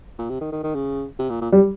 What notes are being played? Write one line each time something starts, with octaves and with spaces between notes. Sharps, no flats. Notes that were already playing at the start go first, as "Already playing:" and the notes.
A#2
C3
D#3
D#3
D#3
C#3
C3
A#2
A#2
G3